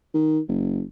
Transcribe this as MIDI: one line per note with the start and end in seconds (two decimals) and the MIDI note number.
0.14 0.39 51
0.48 0.82 30